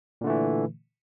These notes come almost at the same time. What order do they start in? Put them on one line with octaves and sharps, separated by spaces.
A#2 D3 A3 E3